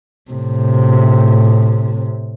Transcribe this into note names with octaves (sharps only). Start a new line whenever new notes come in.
A2 C3